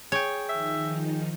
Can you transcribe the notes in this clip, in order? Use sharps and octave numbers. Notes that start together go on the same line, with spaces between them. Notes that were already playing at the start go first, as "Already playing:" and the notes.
G#4 C#5 G5
D#3 F3 D#4 E5